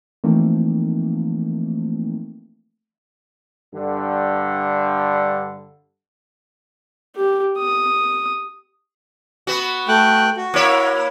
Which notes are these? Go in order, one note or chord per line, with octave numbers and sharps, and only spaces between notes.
E3 F3 A3 A#3 C4 D#4
G2 D3
G4
D#6
B3 F#4
A3 G5 F#6
F#4
A#3 E4 C#5